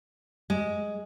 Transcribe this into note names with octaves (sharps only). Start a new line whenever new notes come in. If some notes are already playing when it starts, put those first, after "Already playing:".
G#3